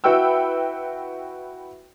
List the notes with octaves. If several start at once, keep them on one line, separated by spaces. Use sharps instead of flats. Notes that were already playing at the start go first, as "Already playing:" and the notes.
E4 F#4 B4 G5 E6